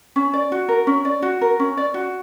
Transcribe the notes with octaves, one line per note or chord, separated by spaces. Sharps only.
C#4
D5
F#4
A#4
C#4
D5
F#4
A#4
C#4
D5
F#4